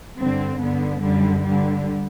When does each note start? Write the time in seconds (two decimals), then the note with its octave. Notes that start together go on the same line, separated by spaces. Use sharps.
0.18 G2 D3 C4
0.59 G2 D3 B3
1.01 F#2 D3 G3
1.43 G2 D3 G3